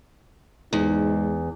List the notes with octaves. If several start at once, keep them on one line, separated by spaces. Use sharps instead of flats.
E2 G#2 D#4